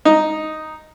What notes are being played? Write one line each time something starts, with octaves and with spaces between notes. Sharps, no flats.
D#4